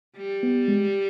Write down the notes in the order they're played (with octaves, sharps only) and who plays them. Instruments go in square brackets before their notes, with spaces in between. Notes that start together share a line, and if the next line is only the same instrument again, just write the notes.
[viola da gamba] G3
[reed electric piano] B3
G#3